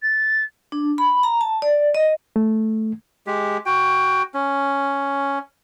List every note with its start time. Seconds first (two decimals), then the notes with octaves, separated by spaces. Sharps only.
0.02 A6
0.72 D4
0.98 B5
1.23 A#5
1.41 A5
1.62 D5
1.95 D#5
2.36 A3
3.27 G#3 G4
3.66 F#4 G5
4.34 C#4